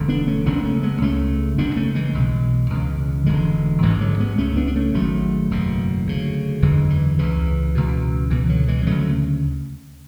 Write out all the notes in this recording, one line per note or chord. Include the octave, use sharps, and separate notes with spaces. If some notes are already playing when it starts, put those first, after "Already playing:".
Already playing: E1 D2 D3
B3 D4
A3 C#4
F#1 E2 C#3 B3 D4
A3 C#4
G#3 B3
C#2 C#3 A3 C#4
F#1 F#2 C#3 B3 D4
A3 C#4
E3 G#3
B1 B2
C#2 C#3
E1 D2 D3 E3 G#3
A1 G#2 E3 G#3
D3 F#3
G#3 B3
C#2 C#3 A3 C#4
B3 D4
D4
A3 C#4
G#1 G#2 F#3 A3
F#1 E2 B2
D2 C#3
F#1 E2 D3 E3 G#3
E3
C#2 C#3 E3
C#2 B2
C#2 B2 E3
D3 F#3
E3 G#3
D2 C#3 F#3 A3